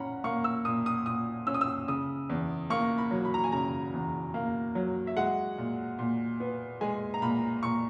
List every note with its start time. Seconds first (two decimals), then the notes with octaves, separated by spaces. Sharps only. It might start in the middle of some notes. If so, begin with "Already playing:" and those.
Already playing: A#2 C#4 F#5 A#5 B5
0.24 A#3 C#6
0.44 E6
0.65 A#2 D#6
0.86 D#6
1.06 A#2 D#6
1.47 C#4 E6
1.54 D#6
1.61 E6
1.88 C#3 D#6
2.29 E2
2.70 A#3 C#6
2.98 B5
3.11 F#3
3.25 B5
3.34 A#5
3.44 G#5
3.52 C#3 A#5
3.93 E2
4.34 A#3
4.75 F#3
5.07 E5
5.16 G#3 F#5
5.58 A#2
5.99 A#2
6.40 B3
6.81 G#3 G#5
7.14 A#5
7.22 A#2 B5
7.63 A#2 C#6